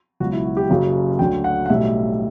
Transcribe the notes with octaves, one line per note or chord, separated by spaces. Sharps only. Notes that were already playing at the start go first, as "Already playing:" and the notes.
C#2 B2 F#3 F#4
E4
F#4
G4
F#1 F#2 C#3 F#3
D2 D3 F#3 G5
F#5
F#5
B1 A2 G3 E5